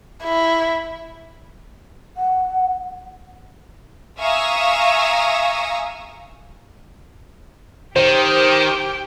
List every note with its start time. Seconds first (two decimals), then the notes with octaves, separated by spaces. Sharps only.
0.24 E4
2.16 F#5
4.19 E5 F5 G#5 A#5 C#6 D#6
7.96 D#3 G4 C5 G5